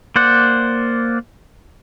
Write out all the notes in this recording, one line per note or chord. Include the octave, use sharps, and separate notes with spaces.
A#3 C5 D5 F#5